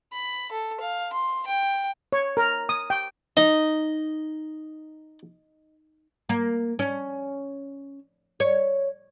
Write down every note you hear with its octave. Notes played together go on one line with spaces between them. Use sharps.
B5
A4
F5
C6
G5
C#5
A#4
D#6
G5
D#4 D#5
A#3
C#4
C#5